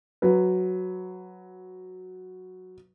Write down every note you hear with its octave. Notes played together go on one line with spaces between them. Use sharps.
F#3 B4